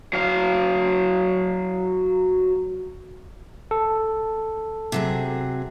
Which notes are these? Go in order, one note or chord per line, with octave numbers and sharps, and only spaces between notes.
F#3 F5
A4
C3 F#3 G#4